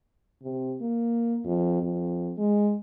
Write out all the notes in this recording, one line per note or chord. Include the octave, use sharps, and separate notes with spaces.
C3
A#3
F2
F2
G#3